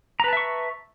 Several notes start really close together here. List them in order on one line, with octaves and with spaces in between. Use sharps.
A#5 B4 A5 E5 C#6